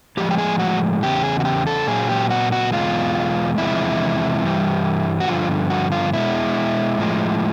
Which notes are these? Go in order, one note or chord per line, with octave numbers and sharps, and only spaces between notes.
A2 F3 G#3 G4
G4
G#4
F#4
E2 C#3 G4
G#4
F#4
G4
A4
A#2 F#3 G#4
G4
F#4
F#4
E2 B2 G#3 F4
E2 C3 F3 G#3 E4
G2 E3 G3
F#4
G2 D3 F3 F4
F#4
F4
B2 G#3 E4
A2 F3 G#3